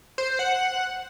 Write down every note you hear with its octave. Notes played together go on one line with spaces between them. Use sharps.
C5
F#5